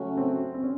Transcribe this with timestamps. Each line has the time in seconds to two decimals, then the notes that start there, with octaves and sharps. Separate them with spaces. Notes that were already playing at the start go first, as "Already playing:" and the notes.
Already playing: C#3 F#3 A3 C#4 F#4
0.17 C4
0.54 C4
0.63 C#4